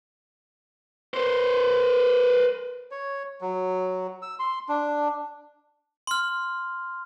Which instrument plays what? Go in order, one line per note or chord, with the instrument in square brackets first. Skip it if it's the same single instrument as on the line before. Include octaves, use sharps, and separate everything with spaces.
[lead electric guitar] B4 C5
[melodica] C#5
F#3
E6
C6
D4
[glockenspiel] C6 F6